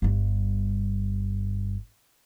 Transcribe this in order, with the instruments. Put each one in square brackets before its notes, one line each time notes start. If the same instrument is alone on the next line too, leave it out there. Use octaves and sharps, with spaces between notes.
[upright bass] G1 G2